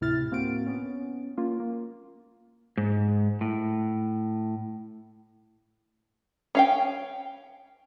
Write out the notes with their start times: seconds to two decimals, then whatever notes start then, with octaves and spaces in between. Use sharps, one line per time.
0.01 D2 A2 C3 E4 F6 A6
0.31 A2 A#3 C4 F#4 D7
0.66 B3 C#4
1.37 A#3 C#4 F4
1.60 A#3
2.77 G#2
3.41 A2
6.55 C#4 F5 G5